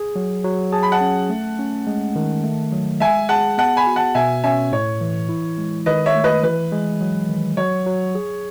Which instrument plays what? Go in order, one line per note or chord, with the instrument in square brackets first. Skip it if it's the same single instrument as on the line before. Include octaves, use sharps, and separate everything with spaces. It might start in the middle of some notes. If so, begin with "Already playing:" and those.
Already playing: [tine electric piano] G#4
F#3
F#3
[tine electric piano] G#4 [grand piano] A5
[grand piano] B5
F#5 A5
[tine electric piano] C#4
A3
C#4
G#3
D#3
A3
F#3
[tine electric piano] G#3 [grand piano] E5 G#5
[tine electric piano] G#4 [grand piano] F#5 A5
[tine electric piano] B3 [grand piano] F#5 A5
[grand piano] G#5 B5
[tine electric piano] F#4
[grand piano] F#5 A5
[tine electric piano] B2 [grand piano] E5 G#5
[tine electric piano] C#4 [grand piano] E5 G#5
[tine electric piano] A2 [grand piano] C#5
[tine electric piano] E3
E4
G#3
[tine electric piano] D#3 [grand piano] B4 D#5
[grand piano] C#5 E5
[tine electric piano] A3
[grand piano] B4 D#5
[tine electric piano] E3 [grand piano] B4
[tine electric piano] G#3
F#3
D#3
[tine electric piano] F#3 [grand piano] C#5
[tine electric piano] F#3
G#4